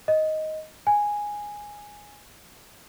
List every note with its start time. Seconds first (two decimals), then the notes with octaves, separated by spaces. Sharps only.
0.08 D#5
0.87 G#5